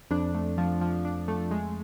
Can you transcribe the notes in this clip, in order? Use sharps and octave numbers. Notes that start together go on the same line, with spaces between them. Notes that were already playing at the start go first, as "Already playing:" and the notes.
F2 D4
A3
F3
F3
D4
A3
G#3